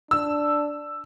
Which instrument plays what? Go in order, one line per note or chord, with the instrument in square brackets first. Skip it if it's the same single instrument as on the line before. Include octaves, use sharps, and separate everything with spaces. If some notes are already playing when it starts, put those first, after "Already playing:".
[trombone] D4 [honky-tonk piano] E6